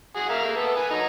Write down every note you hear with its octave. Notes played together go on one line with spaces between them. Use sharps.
F#4 G#4
A#4 E5 F5
A3 A#3
B3 A4
B4 G#5
F#3 D#4